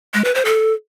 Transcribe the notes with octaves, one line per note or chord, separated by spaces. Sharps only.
G#3
B4
C5
A4